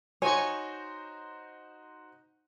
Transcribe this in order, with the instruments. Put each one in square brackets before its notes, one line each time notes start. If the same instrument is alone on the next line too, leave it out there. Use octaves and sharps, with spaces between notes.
[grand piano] D#4 F#4 C5 [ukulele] C#5 [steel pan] G#5 C#6